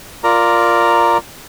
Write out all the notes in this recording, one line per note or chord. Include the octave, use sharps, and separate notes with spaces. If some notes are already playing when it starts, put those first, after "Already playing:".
F4 A#4 D5 A#5